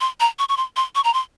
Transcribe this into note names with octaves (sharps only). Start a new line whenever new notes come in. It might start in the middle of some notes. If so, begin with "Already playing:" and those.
C6
A#5
C#6
C#6
C6
C6
C#6
A#5
C6